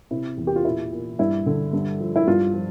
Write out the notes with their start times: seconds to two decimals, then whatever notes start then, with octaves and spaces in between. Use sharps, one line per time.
0.11 C3 E4
0.38 E2
0.47 G4
0.56 F4
0.65 A#2 E4
0.93 A#2
1.19 G2 E4
1.46 D3
1.73 G2
2.00 F3
2.16 E4
2.27 G2 F4
2.54 F3